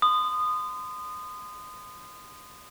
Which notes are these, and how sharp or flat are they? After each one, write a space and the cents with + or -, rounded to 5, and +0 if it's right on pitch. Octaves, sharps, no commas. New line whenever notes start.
C6 -35 D#6 -20